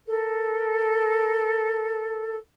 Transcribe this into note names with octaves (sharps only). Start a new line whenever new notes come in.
A4 A#4